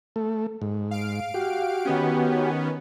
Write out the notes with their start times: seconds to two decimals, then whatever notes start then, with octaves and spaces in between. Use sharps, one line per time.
0.16 A3
0.62 G#2
0.91 F5 D7
1.34 F#4 G4
1.85 D#3 B3 C#4